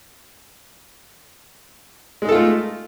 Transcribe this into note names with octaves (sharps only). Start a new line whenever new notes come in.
G#3 A3 D#4 F4 A4